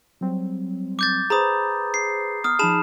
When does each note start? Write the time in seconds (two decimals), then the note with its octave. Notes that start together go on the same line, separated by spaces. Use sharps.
0.21 F#3 G3 C4
0.99 D6 G6 A6
1.30 G#4 B4 C5 A#5 B5 D#6
1.94 C7
2.44 B3 D#6 F6
2.59 F3 D#4 G#4 A5 B5 E7